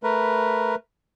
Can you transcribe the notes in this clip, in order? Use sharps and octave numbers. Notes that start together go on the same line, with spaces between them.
A3 A#4 B4